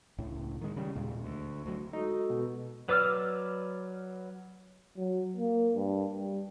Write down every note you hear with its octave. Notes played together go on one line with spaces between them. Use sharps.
C#2 A2
D#3 G#3
C#3 G3
D#2 A#2 G#3
D2
D2 F#3
G#3 D#4 F#4 A4
B2
F#3 B4 D5 E6 F6
F#3
A#3
G2
G3